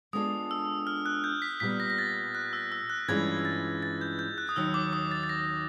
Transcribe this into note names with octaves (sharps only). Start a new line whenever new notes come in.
G#3 B3 D4 F4 A4 D#6
E6
F6
F#6
G6
B6
A#2 G3 B3 B6
A#6
A#6
A6
F#6
E6
E6
F#6
G2 E3 G#3 C#4 F4 G#6
G#6
A6
A6
G6
G6
F#6
D#6
D#2 D#3 F#3 E6
D6
D#6
A6
A6
A#6